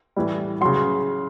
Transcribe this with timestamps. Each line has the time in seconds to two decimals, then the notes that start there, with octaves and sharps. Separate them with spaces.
0.16 A2 E3 G3
0.61 C#3 F#3 C6